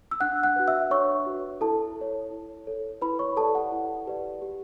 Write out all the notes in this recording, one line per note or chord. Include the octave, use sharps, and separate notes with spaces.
E6
D4 F#5 F#6
F#5 F#6
F#4 B4
E5 E6
D4 C#5 C#6
F#4 B4
E4 A4 A5
A4
C#5
E4
A4 C#5
E4 B4 B5
C#5 C#6
G4 A4 B4 D5 A5
F#5
E4
G4 B4 D5
G4